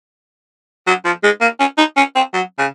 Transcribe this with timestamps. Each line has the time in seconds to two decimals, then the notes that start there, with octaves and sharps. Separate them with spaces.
0.87 F#3
1.05 F3
1.24 G#3
1.41 A#3
1.60 C#4
1.78 D#4
1.97 C#4
2.16 C4
2.34 F#3
2.59 C#3